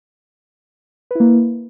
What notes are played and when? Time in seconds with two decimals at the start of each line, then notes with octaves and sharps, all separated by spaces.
1.11 B4
1.15 E4
1.20 A#3